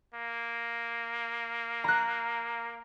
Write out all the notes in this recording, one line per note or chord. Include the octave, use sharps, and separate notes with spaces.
A#3
A#5 F#6